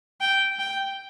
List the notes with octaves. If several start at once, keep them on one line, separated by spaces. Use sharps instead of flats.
G5
G5